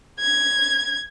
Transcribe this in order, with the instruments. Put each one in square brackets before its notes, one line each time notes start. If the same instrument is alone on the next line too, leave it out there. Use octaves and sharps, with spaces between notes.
[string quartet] G#6